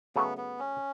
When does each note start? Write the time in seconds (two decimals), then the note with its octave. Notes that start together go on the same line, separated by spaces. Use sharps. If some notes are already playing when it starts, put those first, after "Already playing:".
0.16 C#3 F#3 A3 B3
0.38 B3
0.59 C#4